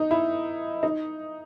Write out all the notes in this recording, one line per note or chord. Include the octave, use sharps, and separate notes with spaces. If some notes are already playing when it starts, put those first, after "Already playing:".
Already playing: D#4
E4
D#4